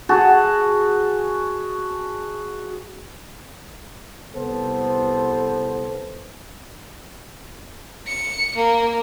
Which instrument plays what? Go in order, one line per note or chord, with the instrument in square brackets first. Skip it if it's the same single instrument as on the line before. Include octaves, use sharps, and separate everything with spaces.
[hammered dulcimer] F#4 G#4 A5
[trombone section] C2 B3 A4 C5
[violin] C#7
A#3